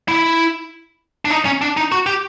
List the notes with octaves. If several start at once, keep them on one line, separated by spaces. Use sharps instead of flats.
E4
D4
D#4
C#4
D4
D#4
F#4
G4